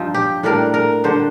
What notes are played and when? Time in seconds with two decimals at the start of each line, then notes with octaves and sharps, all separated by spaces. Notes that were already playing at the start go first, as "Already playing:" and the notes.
Already playing: G2 F3 C4 D#4 F4
0.14 G4
0.43 A2 G3 A#3 D4 A#4
0.74 A#4
1.04 D3 G3 D4 C5